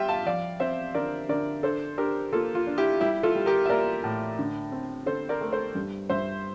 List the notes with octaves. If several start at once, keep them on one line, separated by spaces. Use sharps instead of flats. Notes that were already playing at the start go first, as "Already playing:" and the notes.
Already playing: G3 F4 G4 E5 G5
F5 A5
F3 D5 F5
C4 C5 E5
D3 A#4 D5
D3 A#4 D5
D4 A4 C5
D4 G4 A#4
A#3 F4 A4
F4
D4
E4 G4
G3 E4 G4
F4 A4
G3
G4 A#4
E5
A#3 A#4 D5
A2
D3
C4
D3 A4 C5
A#4 D5
A3
A4 C5
G2
G2 C5 E5